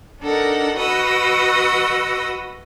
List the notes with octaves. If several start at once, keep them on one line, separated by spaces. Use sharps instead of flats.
D4 D#4 A4 A#4 F#5
F#4 B4 D#5 F#5 D#6 E6